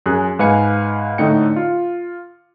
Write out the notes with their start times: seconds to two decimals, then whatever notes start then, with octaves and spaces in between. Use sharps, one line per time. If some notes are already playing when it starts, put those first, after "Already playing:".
0.06 F#2 G#4 F#6
0.39 G#2 B4 F5 G#5 C#7
1.18 A2 D3 A3 D#4 G5 C#7
1.56 F4